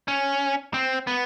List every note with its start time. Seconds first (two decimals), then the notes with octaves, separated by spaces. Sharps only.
0.08 C#4
0.74 C4
1.07 B3